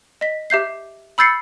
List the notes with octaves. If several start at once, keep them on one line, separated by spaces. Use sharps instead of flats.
D#5 B6
G4 E5 G6 C7
B5 E6 G6 A6 C7 C#7